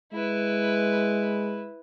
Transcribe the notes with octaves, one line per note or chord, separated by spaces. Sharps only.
G#3 E4 B4